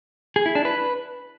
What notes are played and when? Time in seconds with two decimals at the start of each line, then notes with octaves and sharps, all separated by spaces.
0.36 G#4
0.46 E4
0.55 D4
0.65 B4